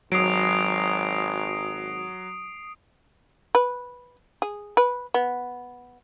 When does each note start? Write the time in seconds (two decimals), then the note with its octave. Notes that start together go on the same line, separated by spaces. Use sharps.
0.12 G#1 F#3 D#6 C7 D7
3.55 B4
4.42 G#4
4.77 B4
5.14 B3